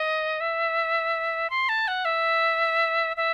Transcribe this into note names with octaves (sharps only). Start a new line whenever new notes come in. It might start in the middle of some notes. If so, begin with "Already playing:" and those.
Already playing: D#5
E5
C6
A5
F#5
E5
E5